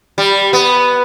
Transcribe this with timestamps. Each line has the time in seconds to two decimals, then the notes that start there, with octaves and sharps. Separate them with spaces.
0.18 G3
0.53 B3